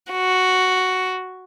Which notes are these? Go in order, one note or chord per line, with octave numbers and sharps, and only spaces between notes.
F#4